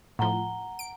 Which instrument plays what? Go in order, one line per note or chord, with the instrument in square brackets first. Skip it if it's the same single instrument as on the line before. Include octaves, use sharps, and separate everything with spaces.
[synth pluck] A2 F3 [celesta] F#5 A#5 G7
[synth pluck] D7